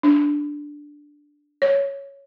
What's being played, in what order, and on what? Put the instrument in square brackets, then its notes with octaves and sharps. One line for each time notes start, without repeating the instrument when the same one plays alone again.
[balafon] D4
C#5